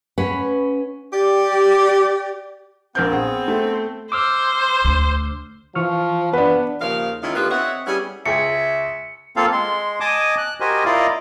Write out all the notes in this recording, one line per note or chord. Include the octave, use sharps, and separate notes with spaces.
C#4 B4 F#5
G4 D5
A#1 B3 C4 A#4 G6
G#4 F#5
A3
C5 D6 E6 F6
D2
E3 F3 C#6 F6
B3 D4 B4
D#2 C#3 F3 A#4 F5
D#3 G#3 C#4 E4 F4
D3 A#3 B3 F4 G4 B4
C4 C#5 D#5 E5 F#5
G3 B3 C#4 E4 G#4
C#2 G#4 E5 G5 C#7
A#3 C4 F4 A4 F5
G#3 C6
D#5 G#5 A5 D6 D#6
F#6
F#4 G4 A#4 C5 D#5 G#5
E4 F4 A#4 D5 D#5 F5